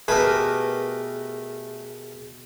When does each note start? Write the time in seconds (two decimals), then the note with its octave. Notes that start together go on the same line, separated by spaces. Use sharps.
0.08 B2 A3 G4 G#4 A#4 B4 D#6